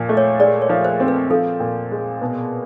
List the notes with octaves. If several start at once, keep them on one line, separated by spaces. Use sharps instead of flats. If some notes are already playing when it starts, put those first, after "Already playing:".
Already playing: A#2 F3
A3
C#5
G#3 D5
C#5
F3
C5
C4
B4
F3 A4
A#2
G#3
B2